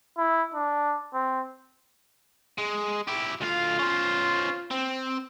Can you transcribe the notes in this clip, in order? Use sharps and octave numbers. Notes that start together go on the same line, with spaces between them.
E4
D4
C4
G#3
E4 G4
D2 F4 F5
C#4 C5
C4